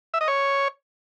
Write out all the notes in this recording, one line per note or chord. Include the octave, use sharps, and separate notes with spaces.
E5
D#5
C#5